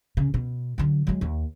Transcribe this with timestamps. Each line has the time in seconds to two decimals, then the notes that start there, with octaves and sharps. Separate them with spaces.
0.17 C#3
0.34 B2
0.78 D3 F#3
1.07 F#3 G#3
1.21 D#2